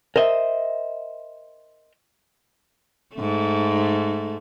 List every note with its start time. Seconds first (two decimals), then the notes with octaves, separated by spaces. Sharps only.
0.16 A#4 C5 D#5 E5
3.16 G#2 A3